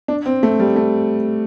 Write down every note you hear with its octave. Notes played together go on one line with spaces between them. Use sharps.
D4
C4
A3
G3
A3